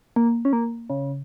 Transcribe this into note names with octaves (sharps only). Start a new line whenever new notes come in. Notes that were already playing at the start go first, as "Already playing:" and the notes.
A#3
C#4
A#3
C#3